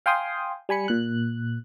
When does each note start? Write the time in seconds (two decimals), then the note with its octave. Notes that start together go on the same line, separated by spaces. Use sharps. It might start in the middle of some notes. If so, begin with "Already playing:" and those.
0.06 F5 G5 G#5 C6 D#6
0.69 G3 G#5 B5 C#7
0.88 A#2 F#6